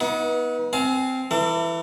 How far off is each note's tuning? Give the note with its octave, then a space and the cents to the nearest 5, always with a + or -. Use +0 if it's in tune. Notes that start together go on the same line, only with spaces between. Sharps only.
B3 -20 D#4 +35
C4 -10 F5 +0 G#5 +30
E3 +15 A4 +45